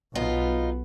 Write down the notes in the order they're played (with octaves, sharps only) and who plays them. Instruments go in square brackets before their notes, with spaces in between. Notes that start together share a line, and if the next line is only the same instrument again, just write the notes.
[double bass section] B1 B3 [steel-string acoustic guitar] D#4 F4